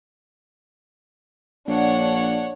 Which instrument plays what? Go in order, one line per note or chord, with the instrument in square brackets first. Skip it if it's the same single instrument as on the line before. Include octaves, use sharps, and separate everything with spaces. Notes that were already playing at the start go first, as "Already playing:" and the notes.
[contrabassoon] A#1 [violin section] D4 C#5 F#5